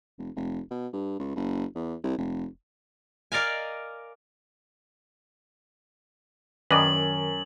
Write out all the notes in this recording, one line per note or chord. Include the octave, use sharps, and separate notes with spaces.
F1
F1
B2
G2
C#2
F#1
E2
C2
F1
A#4 D5 D#5 F5 G#5
F#2 D#3 B4 D5 D#5 F#7